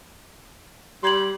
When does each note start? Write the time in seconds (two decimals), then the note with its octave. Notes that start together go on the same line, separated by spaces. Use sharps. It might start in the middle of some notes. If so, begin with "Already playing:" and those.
1.03 G3 C6 G#6 F#7